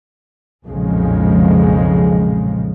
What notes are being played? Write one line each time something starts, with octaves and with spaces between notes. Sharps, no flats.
B1 F2 A#2 C#3 F3 G#3